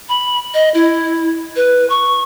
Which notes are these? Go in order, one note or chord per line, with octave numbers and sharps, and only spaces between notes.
B5
D#5
E4
B4
C#6